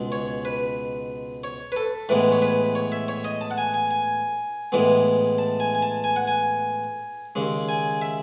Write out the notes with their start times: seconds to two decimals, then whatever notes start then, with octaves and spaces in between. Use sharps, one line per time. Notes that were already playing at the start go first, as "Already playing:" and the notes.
Already playing: C#2 B2 G#3
0.12 C#5
0.45 B4
1.44 C#5
1.72 B4
1.77 A4
2.09 A2 E3 G#3 B3 B4
2.32 C#5
2.42 B4
2.75 C#5
2.92 E5
3.08 C#5
3.24 D#5
3.41 A5
3.51 F#5
3.58 G#5
3.74 G#5
3.91 G#5
4.72 A2 E3 G#3 B3
5.38 A5
5.60 G#5
5.75 G#5
5.82 A5
6.04 G#5
6.16 F#5
6.27 G#5
7.35 D#2 C#3 G#3
7.68 G#5
8.02 E5